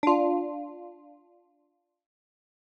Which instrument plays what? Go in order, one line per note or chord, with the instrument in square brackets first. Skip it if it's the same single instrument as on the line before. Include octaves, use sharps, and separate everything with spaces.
[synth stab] D4 F4